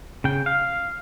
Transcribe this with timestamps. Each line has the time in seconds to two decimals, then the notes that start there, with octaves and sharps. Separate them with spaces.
0.24 C#3 G5
0.46 F5